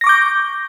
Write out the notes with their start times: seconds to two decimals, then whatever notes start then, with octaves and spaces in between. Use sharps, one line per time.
0.01 A#6
0.04 C#6
0.07 D6
0.09 G6